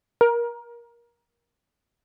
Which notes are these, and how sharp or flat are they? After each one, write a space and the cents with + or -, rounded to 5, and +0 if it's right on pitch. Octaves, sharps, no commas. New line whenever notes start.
A#4 +20